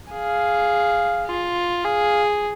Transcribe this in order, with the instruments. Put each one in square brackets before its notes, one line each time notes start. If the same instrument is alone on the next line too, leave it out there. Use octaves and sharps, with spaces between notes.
[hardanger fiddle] G#4 [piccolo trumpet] F5
[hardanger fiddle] F4
[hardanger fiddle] G#4 [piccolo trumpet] F5